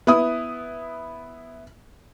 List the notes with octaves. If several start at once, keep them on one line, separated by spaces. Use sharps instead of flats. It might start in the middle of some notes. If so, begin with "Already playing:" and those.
B3 E4 D#6